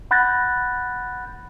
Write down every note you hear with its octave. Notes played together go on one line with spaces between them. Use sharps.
F#5 B5 F#6 G6 A6 A#6